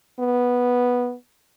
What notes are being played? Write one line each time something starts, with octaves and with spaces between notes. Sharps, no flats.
B3